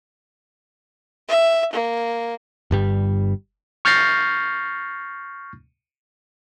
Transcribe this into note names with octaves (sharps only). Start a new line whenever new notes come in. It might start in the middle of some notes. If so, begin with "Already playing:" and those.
E5
A#3
G1 G2 G3
C#6 F6 G6 A6 A#6 C7